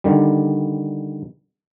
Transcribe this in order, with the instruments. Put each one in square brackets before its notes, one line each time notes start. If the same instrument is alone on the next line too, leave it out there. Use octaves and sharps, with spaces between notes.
[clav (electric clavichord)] D3 D#3 G3